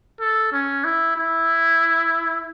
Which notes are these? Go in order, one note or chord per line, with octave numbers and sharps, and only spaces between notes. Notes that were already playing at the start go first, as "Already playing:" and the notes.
A4
C#4
E4
E4